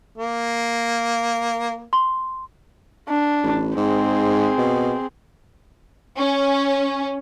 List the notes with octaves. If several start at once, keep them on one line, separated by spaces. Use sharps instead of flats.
A#3
C6
D4
A1
G#2 C4 G#4
B2
C#4